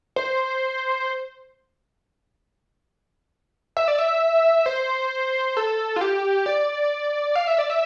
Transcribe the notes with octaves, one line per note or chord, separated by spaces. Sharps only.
C5
E5
D5
E5
C5
A4
F4
G4
D5
F5
E5
D5
E5